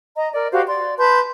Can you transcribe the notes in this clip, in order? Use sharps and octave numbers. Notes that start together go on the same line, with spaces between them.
D#5 A#5
A#4 D5
F#4 G4 C5 F5
D5 C6
B4 A5 C6 G6